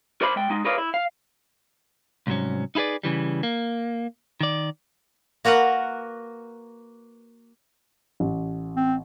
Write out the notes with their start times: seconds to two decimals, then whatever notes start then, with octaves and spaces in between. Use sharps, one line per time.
0.21 A#4 C5 D5 E5 B5
0.36 G#3 G5
0.50 G#3 D#4
0.65 G#4 A#4 B4 C#5 D5 F5
0.78 E4
0.94 F5
2.27 C2 G#2 F#3 C#4
2.75 D#4 E4 G#4 B4 D5
3.03 C#3 E3 G3
3.43 A#3
4.41 D#3 D5
5.45 A#3 F#4 A#4 B4 F#5
8.20 A1
8.76 C4